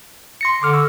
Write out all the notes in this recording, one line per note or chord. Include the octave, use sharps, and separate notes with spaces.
C6 A#6 C#7
D3 C6 D6 F6
C#6 E6